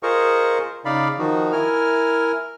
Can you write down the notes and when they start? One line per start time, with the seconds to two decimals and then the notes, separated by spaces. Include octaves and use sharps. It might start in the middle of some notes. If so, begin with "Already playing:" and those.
0.03 F4 G#4 A#4 C5 D#5 C#6
0.85 C#3 D#4 D5 F5 B5
1.19 D#3 F3 D#4 F#4
1.52 E4 A#4 G#5 F6